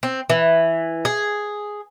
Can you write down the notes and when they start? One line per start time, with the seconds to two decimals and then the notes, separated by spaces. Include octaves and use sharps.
0.03 C4
0.30 E3
1.05 G#4